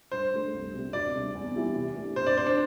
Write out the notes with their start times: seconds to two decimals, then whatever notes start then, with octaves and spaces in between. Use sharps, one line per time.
0.12 G2 C5
0.33 D3 A3 D4 A4
0.53 C2
0.74 C3 G3 C4 G4
0.93 D2 D5
1.14 C3 G3 D4 G4
1.35 E2
1.55 E3 G3 E4 G4
1.75 C3
1.96 A3 D4 G4
2.16 D3 C5
2.26 D5
2.36 C4 C5
2.42 D4 G4